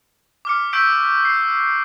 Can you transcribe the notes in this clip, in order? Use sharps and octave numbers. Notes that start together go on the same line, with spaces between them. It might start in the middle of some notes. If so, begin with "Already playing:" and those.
D6 F6 C#7
C#6 E6 G6 B6 D7
C7